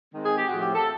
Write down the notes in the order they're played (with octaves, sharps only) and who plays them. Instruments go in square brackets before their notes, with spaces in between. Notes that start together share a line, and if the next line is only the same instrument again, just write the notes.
[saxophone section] D#3 G#3 C4
G#4
G4
A2 F3 A3 C4 F4 F#4
G4
A4